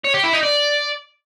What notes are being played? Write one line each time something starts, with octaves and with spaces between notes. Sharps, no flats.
C#5
G4
E4
D#4
D5